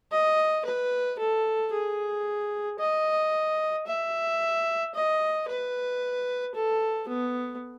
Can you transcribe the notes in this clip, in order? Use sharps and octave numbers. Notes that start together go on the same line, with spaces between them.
D#5
B4
A4
G#4
D#5
E5
D#5
B4
A4
B3